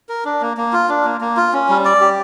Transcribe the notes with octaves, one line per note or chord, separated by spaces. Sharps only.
A#4
D4
A#3
A#3
F4
D4
A#3
A#3
F4
C#4
G3
D5
G4